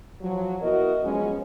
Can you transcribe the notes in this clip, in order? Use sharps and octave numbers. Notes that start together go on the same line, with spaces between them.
F3 F#3
B3 E4 F#4 A#4 D#5
F3 F#3 G#3 B3 C#4